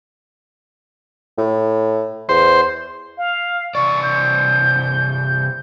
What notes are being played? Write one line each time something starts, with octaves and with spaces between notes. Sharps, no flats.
A2
E2 C5
F5
C3 E3 D5 C#6
G6